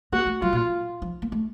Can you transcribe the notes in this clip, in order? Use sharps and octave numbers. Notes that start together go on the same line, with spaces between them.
A#3 F#4
A3
F#3 F4
A#2
F3
A#3
A3